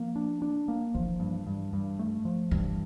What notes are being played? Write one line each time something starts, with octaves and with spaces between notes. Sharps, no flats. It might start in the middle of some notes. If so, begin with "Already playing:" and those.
Already playing: F3 A#3
D4
D4
A#3
E3 F3
G2
G2
G2
A3
F3
G2 E3